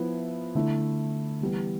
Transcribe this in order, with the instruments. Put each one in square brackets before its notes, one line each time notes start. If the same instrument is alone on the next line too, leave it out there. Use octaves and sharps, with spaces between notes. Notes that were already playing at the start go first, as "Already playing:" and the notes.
Already playing: [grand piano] F3 B3 E4
D3 A3 E4
E3 G3 B3